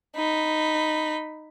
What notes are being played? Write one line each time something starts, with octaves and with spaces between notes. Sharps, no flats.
D#4 B5